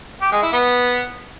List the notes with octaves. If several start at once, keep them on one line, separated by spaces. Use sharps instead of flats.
G4
G#3
E4
B3